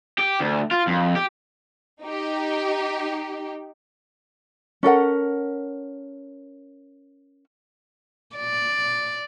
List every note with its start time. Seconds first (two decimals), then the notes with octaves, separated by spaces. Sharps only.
0.18 G4
0.40 D2
0.71 F4
0.87 F2
1.15 G4
2.02 D#4 G4
4.83 C#4 A4 A#4 F#5
8.36 D5